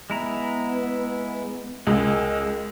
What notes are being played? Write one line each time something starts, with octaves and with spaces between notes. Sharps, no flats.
G#3 B3 E4 A#5
C#2 G#3 A#4